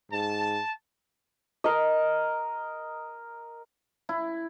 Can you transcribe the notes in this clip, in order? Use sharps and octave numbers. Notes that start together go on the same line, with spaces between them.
G#2 A5
A#4 D#5
E4